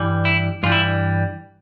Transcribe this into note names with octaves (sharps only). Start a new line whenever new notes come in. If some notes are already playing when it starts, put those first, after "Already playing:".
Already playing: G2 E3 G3
E4
G2 E3 G3 F4
E4